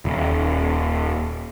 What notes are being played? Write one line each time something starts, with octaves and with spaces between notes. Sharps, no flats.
D#1